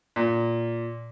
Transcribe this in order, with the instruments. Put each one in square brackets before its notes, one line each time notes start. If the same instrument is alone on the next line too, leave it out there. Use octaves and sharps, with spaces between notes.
[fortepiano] A#2